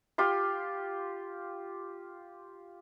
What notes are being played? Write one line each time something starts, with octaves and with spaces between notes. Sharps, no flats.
F4 G4 C6